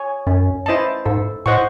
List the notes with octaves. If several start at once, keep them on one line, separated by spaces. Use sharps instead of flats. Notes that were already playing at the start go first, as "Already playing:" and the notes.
Already playing: C#5 G#5
F#2 C#4
E4 C5 D#5 A5
G#2 A4
A2 C5 D#5 F#5 C#6